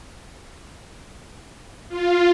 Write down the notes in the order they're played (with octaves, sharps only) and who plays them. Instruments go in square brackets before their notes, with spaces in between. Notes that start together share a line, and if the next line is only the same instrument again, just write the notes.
[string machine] F4